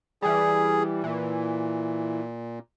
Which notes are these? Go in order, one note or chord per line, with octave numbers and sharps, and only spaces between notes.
E3 G3 G#4
A#2 E3